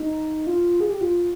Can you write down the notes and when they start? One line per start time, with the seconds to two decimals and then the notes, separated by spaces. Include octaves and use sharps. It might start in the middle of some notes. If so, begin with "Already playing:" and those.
Already playing: D#4
0.47 F4
0.80 G#4
0.90 G4
1.01 F4